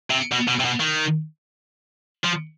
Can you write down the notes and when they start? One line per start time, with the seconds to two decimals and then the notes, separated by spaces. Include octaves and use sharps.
0.10 C3
0.32 B2
0.48 B2
0.59 C3
0.64 B2
0.80 D#3
2.25 F3